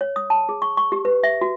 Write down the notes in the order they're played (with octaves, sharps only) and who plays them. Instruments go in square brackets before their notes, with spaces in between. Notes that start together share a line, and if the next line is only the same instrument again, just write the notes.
[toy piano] C#5
D#6
A5
G#4
C#6
C#6
G4
B4
E5
F#4